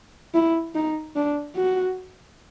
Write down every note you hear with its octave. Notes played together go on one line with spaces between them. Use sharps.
E4
D#4
D4
F#4